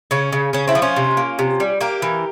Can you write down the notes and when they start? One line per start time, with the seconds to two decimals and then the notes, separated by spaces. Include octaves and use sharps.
0.11 C#3 C#4
0.32 C#3
0.53 C#3 C#4
0.68 C4 E4
0.75 F3
0.82 C#4 F4
0.96 C3
1.17 A#3
1.39 C3
1.60 G3
1.81 A#3 G4 A#4
2.02 E3